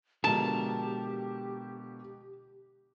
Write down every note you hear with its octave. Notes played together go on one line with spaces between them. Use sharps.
B2 D3 F3 G#3 G4 A#4 A5